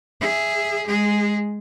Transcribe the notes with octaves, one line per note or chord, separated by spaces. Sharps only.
G#4 E5
G#3 G#4